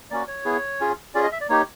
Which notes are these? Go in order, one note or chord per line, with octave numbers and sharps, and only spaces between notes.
A#3 C#4 F#4 D5
C#5
B3 E4 G#4
C#4 F4 G#4
C#4 F4 G#4 D5
D#5
E5
D5
A#3 D#4 G4 C#5